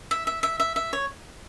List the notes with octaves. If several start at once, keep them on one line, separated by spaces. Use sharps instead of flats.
E5
E5
E5
E5
E5
C#5